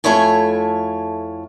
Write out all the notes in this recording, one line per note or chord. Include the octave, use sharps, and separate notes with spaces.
F2 A3 E4 C#5 G#5